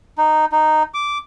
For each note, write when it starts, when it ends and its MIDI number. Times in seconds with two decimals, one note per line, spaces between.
0.18 0.45 63
0.52 0.83 63
0.94 1.18 86